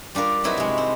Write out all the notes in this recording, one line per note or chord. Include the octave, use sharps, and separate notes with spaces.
G3 D4 F4 A#4
F#3 C4 D#4 E4 F#4 B4
C3 G#3
C4